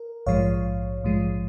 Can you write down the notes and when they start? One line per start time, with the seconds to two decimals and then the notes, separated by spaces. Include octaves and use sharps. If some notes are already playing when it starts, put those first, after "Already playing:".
Already playing: A#4
0.26 A#1 G#2 F3 G#3 C#5 F5
1.03 A#1 G#2 F3 G#3